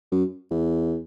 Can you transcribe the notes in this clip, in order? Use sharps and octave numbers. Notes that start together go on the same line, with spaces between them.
F#2
E2